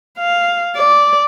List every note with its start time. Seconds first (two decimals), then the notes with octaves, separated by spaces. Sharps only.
0.19 F5
0.76 D5